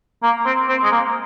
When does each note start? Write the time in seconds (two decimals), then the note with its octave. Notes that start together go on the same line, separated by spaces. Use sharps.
0.23 A#3
0.46 C4
0.68 C4
0.84 G#3
0.91 A#3